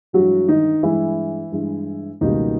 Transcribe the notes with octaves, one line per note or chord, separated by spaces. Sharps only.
G2 E3 F#3 G#3 F#4
D#3 D#4
G2 E3 G#3 E4
G2 E3 G#3
C#2 B2 D#3 G3 A#3 D#4